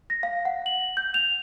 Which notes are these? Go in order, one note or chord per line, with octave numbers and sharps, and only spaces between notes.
A#6
F5
F#5
F#7
G6
F7